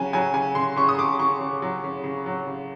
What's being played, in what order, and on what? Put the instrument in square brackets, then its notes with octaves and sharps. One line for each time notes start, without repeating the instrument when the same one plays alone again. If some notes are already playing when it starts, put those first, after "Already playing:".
Already playing: [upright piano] C#3 F#3 G#5
F#3 G#5
C#3 G#5
C#3 C6
C#3 C#6
D#6
C#3 D6
C#3 C#6
C#3
F#3
C#3
C#3
F#3
C#3